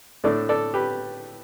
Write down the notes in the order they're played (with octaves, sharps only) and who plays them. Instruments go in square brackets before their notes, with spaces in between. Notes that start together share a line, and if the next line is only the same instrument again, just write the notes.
[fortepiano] A2 A3 D4 A4 D5
A4 D5
G4 B4